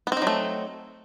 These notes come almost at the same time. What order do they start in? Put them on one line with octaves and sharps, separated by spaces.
B3 C4 D#4 F#3 A3